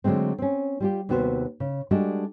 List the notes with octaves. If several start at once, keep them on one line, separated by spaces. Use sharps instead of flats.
D3 F#3 G#3 A3 C4
C4 C#4
G3 F4 G4
D#2 C3 B3 F#4 G4 C5
C#3
G3 G#3 D4 F#4 A4 D#5